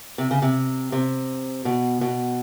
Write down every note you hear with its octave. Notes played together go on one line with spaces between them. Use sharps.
C3
C#3
C3
C3
B2
B2